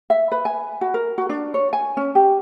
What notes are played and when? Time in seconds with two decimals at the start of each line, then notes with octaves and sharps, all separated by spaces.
0.10 E5
0.32 B4
0.45 G#5
0.81 F#4
0.94 A#4
1.18 F#4
1.29 D4
1.54 C#5
1.73 G#5
1.97 C#4
2.15 G4